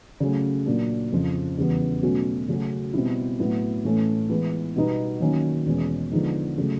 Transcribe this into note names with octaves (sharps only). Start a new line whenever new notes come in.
C#3 F#3 A3 C#4
A#2 F#3 A#3 D4
F2 C#3 F3
E2 C#3 E3 G3 B3
B2 F#3 A3 C#4 F#4
C#3 F#3 A3 C#4 F#4
B2 G3 C4 E4
A2 F#3 B3 E4
A2 E3 A3 C#4
E3 G#3 B3
B2 G3 B3 D#4
D#3 F#3 A#3 C#4
E2 B2 G#3 C#4
D3 F3 G#3 B3 D#4
C#3 F#3 A3